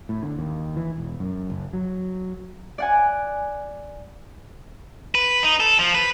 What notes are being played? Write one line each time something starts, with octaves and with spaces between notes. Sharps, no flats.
A2
D3
D#2
E3
E1
F#2
F#1
F#3
D5 F#5 G#5
B4
D#4
A4
F3
B4